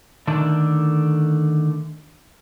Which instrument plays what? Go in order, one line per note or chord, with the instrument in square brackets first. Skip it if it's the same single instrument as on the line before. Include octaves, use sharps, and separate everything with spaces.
[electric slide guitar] D3 D#3 A3 D4 D5